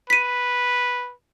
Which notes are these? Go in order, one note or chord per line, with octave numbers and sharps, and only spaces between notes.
B4 B6 D#7